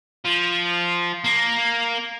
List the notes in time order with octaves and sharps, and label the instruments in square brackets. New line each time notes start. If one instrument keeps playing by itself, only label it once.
[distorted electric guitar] F3
A#3